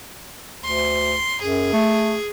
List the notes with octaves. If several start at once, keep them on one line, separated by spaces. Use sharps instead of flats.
D2 C6
F#2 G#4
A3